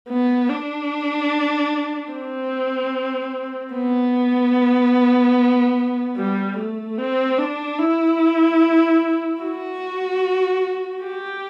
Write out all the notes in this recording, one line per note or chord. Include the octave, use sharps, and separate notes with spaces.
B3
D4
C4
B3
G3
A3
C4
D4
E4
F#4
G4